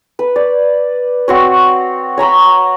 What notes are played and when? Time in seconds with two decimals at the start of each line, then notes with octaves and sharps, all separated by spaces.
0.19 B4
0.36 D5
1.28 C4 F#4 C#5
2.17 C#5 A#5 B5 C#6